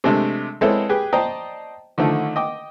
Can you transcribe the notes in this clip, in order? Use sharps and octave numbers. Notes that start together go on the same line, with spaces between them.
C3 G#3 A3 D4
G#3 B3 C4 E4 A4 C#5
G4 G#4 B4
C5 D5 D#5 G5 A5 A#5
D3 D#3 F3 A3
D#5 G5 D6